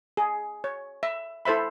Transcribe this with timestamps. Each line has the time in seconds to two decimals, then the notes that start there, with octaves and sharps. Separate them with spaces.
0.17 G#4
0.64 C#5
1.03 E5
1.45 E4 A4 C5 E5 B5